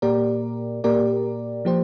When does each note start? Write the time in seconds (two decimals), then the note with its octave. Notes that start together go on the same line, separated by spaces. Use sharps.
0.02 A#2 A#3 G4 A#4 D5
0.84 A#2 A#3 G4 A#4 D5
1.65 F3 A#3 G4 C5